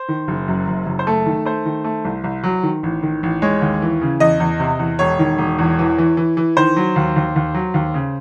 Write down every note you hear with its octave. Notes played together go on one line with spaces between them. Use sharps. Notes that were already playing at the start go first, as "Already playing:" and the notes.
Already playing: C5
D#3
F#1
F#2
F#1
F#1
C5
A3 A4
D#3
A3 C5
D#3
A3
C2
C2
F#3
D#3
A1
D#3
A1
G#3 C#5
D#2
E3
C#3
E2 D#5
E2
C3
E2
E1 C#5
D#3
E1
E2
E3
E3
E3
E3
D#3 C5
F#3
D#2
D#2
D#2
F#3
D#2
C#3